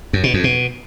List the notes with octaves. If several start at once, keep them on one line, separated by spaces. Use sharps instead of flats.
F#2
B2
F2
B2